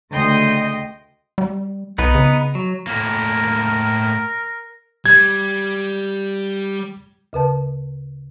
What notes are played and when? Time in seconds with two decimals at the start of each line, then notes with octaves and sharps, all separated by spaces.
0.11 D2 C#3 D#5 G5 C6 D#6
1.38 G3
1.98 C2 B3 D#4 B4
2.15 C#3
2.55 F#3
2.87 A2 A#3 A#4
5.06 G3 G#6
7.33 D2 C#3 B4 A5